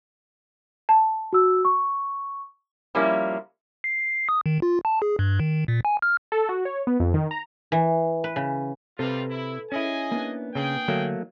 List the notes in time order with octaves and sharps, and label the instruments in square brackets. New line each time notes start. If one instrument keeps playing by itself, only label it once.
[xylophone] A5
[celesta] F#4 E6
C#6
[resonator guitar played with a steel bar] F3 G3 A#3 C#4 E4
[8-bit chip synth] C7
D#6
D#3
F4
A5
G#4
G2
D#3
A#2
G#5
F6
[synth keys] A4
F#4
C#5
B3
F2
D#3
A#5
[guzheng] E3
B4
C#3
[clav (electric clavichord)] C3 [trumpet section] G3 F4 [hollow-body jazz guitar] A4 B4
[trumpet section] E4
[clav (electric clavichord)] C#4 E4 [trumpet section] G#4 D#5 G#5
[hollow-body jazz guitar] A#3 B3 D4
[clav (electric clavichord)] C#3 [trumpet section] G#4 G5
[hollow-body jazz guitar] D3 [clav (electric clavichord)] F#3 A3 A#3